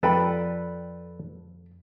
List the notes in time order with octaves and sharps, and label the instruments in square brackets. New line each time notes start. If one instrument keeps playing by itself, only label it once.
[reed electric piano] F2 [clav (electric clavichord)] A4 B4 [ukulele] D5 G5 B5